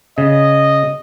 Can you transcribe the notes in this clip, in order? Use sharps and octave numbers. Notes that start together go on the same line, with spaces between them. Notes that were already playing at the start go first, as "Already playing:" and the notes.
C#3 D#5